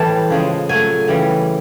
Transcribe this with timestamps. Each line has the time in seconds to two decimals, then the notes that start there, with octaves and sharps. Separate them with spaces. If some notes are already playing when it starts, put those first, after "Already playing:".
Already playing: A2 E3 G3 A5
0.30 C#3 F3 G#3
0.69 A#2 F#3 A3 G#5
1.08 C#3 E3 G3